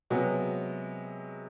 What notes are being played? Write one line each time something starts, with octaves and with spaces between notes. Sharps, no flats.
C3 F#3 G#3 B3